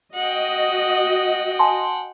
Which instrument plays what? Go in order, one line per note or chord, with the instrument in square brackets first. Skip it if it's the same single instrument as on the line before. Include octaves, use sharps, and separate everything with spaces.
[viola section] F#4 D#5 [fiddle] F#5 G5
[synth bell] G#5 A5 C6